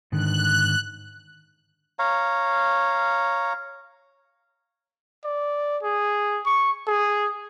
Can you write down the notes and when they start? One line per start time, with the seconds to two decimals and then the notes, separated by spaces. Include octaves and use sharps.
0.12 G#2 D3 D#3 F#6
1.99 C#5 F5 A#5
5.24 D5
5.83 G#4
6.46 C#6
6.87 G#4